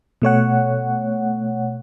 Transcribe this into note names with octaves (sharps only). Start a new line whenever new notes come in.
B2 A3 C#5 F#5